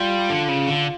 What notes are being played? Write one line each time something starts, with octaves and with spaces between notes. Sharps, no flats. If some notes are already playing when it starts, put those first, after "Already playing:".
Already playing: G3 F4
D3
C#3
D3